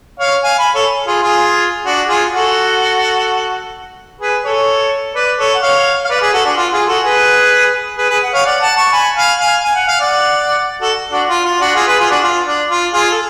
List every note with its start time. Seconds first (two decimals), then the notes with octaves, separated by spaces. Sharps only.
0.20 C#5 F5
0.43 F5 G#5
0.59 G#5 B5
0.75 A4 C#5
1.07 F4 G#4
1.23 F4 G#4
1.85 D4 F#4
2.08 F4 G#4
2.32 F#4 A4
4.20 G#4 B4
4.45 A4 C#5
5.15 B4 D5
5.39 A4 C#5
5.55 F#5
5.62 C#5 F5
6.05 F5
6.10 B4 D5
6.21 G#4 B4
6.33 F#4 A4
6.45 D4 F#4
6.56 F4
6.73 F4 G#4
6.88 F#4 A4
7.03 G#4 B4
7.98 G#4 B4
8.09 G#4 B4
8.23 F#5
8.33 C#5 F5
8.45 D5 F#5
8.61 F#5 A5
8.77 A5 C#6
8.92 G#5 B5
9.16 F5 G#5
9.40 F5 G#5
9.63 G#5
9.75 F#5
9.88 F5
10.00 D5 F#5
10.81 F#4 A4
11.12 D4 F#4
11.29 F4
11.44 F4
11.60 D4 F#4
11.75 F4 G#4
11.87 G#4 B4
11.99 F4 G#4
12.10 D4 F#4
12.23 F4
12.46 D4
12.70 F4
12.93 F4 G#4
13.11 A4